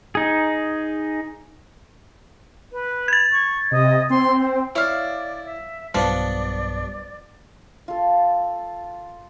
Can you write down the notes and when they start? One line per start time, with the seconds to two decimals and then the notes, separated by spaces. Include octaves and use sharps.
0.15 D#4 G#4
2.73 B4
3.08 G#6 A6
3.32 C#6
3.71 C3 D#5
4.10 C4 C6
4.40 C5
4.75 E4 C#5 D5 F5
5.45 E5
5.94 B1 G2 F3 G3 B3 D4 D5 F#5
7.88 F4 A4